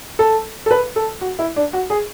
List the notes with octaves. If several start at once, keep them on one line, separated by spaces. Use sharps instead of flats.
A4
A4
B4
A4
F#4
E4
D4
F#4
G#4